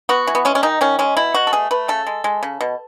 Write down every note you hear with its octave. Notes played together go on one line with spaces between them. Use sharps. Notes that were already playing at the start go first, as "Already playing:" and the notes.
B3 F#4
E3
B3
G#3 C#4
C#4
D#3 D#4
D#3 C#4
G#3 C#4
B2 E4
B2 F#4
A4
A3 G#4
A3 B4
C#3 A4
G#3
G#3
C#3
B2